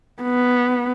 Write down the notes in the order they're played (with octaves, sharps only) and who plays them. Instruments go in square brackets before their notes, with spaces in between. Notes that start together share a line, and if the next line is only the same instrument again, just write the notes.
[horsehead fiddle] B3